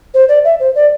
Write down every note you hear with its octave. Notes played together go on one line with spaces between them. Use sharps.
C5
D5
E5
C5
D5